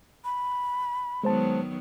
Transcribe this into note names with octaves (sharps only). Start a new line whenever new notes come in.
B5
D#3 F#3 G#3 B3 C5 A5